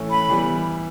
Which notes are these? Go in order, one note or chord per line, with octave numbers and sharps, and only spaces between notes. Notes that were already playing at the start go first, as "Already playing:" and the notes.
Already playing: A2 E3 A3 C#4
B5
E3 G3 B3